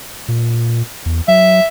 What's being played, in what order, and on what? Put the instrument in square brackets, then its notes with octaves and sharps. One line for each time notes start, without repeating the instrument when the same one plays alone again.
[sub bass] A#2
E2
[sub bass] F#3 [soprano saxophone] E5